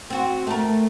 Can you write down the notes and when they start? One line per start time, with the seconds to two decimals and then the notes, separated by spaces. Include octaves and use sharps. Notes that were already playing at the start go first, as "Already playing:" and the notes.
0.10 C4 F#4
0.47 A3 A#4